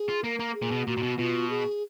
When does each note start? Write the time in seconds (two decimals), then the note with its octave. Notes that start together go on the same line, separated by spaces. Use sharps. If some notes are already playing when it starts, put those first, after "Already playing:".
Already playing: G#4
0.08 F4
0.24 A#3 A#4
0.40 A#3
0.55 G#4
0.62 A#2
0.71 B2
0.87 A#2 F#4
0.97 A#2
1.03 B2
1.17 B2 F4
1.50 G#4